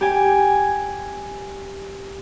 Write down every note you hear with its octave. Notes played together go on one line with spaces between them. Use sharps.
G4 G#5